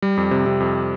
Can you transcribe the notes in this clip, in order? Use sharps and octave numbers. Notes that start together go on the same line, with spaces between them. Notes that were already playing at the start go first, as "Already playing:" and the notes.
G3
F2
C3
C3
F2